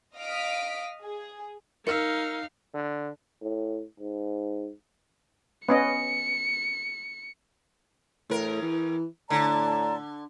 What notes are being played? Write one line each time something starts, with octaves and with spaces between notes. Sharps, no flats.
D#5 F5 D#6 F6 B6 D7
G#4
D#4 A#4 F5 E6 F6 C#7
D3
A2
G#2
B3 C#4 D#5 C#7
E2 A2 A#4
E3
A2 D3 D5 A5 A#5